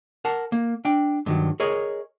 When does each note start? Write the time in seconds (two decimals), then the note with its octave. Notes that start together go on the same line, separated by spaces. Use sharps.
0.25 A#4 F#5 A5
0.52 A#3
0.85 D4 G5
1.26 G2 D#3 F#3
1.60 G#4 A#4 C#5 D#5